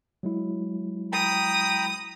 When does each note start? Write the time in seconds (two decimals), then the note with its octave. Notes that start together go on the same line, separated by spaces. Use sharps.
0.23 F#3 G#3 E4
1.12 G5 A#5 B5 D#6